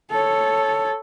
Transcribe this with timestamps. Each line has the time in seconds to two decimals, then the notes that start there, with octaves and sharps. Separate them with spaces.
0.11 A4 C#5